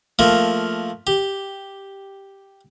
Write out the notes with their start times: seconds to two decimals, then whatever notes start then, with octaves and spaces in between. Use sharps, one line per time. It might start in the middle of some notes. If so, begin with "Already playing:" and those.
0.19 F3 A3 A#3
1.07 G4